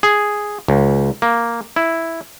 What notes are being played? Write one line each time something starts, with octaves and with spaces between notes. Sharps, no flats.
G#4
C#2
A#3
E4